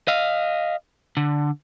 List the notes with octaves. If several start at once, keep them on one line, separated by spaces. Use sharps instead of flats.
D#5 F5
D3